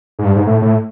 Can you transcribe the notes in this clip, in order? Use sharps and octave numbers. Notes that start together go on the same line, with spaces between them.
G#2
G2
G#2
A2
A2